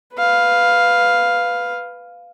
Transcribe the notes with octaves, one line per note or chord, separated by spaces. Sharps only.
B4 F5